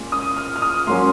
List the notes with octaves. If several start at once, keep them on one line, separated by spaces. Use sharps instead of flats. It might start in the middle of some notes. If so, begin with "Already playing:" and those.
Already playing: A#2 G#3 C#4
D#6
F6
F6
D#6
G#2 F#3 A#3 C#4 C6